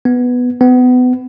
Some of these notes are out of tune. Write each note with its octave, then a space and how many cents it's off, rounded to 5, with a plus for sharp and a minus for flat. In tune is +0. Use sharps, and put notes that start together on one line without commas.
B3 +0
B3 +25